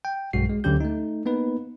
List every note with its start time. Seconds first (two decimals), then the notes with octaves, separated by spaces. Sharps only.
0.05 G5
0.33 B1 G2 G#3 F#4 C7
0.50 G#3
0.64 D2 D3 F#3 C#4 G4 G6
0.81 A3 D#4
1.26 A#3 B3 D#4 B4